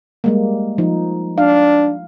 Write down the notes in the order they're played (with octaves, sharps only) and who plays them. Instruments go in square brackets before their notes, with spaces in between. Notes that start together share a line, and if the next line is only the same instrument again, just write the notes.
[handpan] G3 G#3 A#3
F3 D#4
[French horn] D4 [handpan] F5